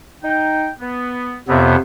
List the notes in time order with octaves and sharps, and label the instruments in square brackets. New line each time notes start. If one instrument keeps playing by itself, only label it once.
[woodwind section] D#4 G5
B3
[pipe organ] F2 C3 B3 [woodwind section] F4 C#5 E5